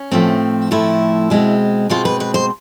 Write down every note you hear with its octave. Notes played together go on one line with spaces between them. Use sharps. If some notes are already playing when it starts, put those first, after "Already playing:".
Already playing: C#4
A2 F3 A3 C4
A2 F3 A3 C4 E4
B2 G#3 C4
B2 G#3 C4 F4
B4
B4
C5